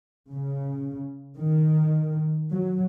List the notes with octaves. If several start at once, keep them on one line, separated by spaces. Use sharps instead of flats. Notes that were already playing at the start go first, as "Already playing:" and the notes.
C#3
D#3
F#3